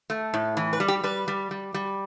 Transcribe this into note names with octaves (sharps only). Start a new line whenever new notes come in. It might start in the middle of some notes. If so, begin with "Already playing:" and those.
A3
A2
E3
B4
G3
G4
G3 B4
G3
G3
G3